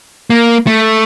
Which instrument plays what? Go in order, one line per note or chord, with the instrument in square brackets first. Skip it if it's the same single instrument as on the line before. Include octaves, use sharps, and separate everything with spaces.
[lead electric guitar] A#3
A3